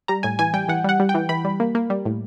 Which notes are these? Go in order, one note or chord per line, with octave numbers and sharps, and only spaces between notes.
G3 A#5
A2 G#5
E3 G#5
G3 G5
E3 F#5
G3 F#5
G3
G5
E3
E3 B5
G3
A#3
A#3
G3
A2